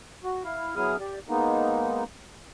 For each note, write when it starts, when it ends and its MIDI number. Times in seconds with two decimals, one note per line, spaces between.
0.24 0.43 66
0.44 0.75 64
0.44 0.75 77
0.76 0.96 54
0.76 0.96 59
0.76 0.96 64
0.76 0.96 68
0.76 0.96 87
0.76 0.96 89
1.00 1.19 67
1.00 1.19 74
1.29 2.04 56
1.29 2.04 58
1.29 2.04 59
1.29 2.04 63